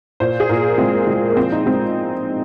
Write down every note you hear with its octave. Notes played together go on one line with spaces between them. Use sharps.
A#2 C5
G#4
A#2 A#4
G#3 C4
G#3
A#3
F3 C4
D#4
G#3 C4